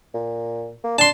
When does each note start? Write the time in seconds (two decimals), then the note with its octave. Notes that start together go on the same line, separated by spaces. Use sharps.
0.15 A#2
0.84 A#3
0.98 D4 A5 C6